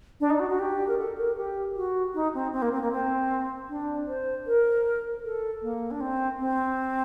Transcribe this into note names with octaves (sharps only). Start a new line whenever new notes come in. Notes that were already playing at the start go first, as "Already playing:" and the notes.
D4
D#4
F#4
F#4
G4
A#4
A4
A#4
G4
F#4
D#4
C4
C4
A#3
C4
A#3
C4
D4
C5
A#4
A4
A#3
D4
C4
C4